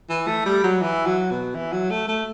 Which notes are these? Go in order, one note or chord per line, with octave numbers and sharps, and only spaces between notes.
E3
A3
G3
F#3
E3
F#3
B2
E3
F#3
A3
A3